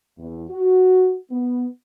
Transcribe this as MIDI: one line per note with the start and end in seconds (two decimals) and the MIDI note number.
0.18 0.44 40
0.50 1.16 66
1.30 1.65 59